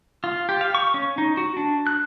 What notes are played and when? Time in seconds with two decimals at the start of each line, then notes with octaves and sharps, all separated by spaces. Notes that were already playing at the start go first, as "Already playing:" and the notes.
0.24 F4
0.49 G4
0.61 F5
0.75 C#6
0.94 C#4
1.18 D#4
1.37 F#4
1.57 D4
1.87 F#6